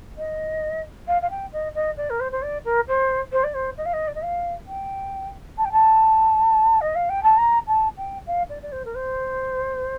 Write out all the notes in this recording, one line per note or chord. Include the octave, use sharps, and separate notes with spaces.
D#5
F5
F5
G5
D#5
D#5
D5
A#4
C5
C5
D5
A#4
C5
C5
D5
C5
D#5
F5
D#5
D5
D#5
F5
G5
A5
G5
A5
D#5
F5
G5
A5
A#5
A5
G5
F5
D5
D5
C5
A#4
C5